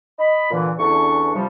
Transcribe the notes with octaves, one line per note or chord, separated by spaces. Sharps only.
D#5 B5
A#2 D3 E3
E2 D3 E3 C#4 D4 C#6
C3 F3 G3